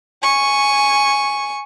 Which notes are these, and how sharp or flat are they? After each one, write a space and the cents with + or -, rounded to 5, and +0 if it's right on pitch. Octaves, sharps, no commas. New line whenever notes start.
G#5 +0 C#6 +0